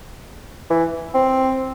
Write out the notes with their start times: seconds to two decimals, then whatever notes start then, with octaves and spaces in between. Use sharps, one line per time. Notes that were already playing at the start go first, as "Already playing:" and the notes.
0.70 E3
1.15 C4